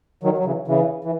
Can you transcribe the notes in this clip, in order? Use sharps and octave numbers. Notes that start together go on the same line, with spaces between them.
D#3 F#3
F#3
C#3 E3
C#3 E3
E3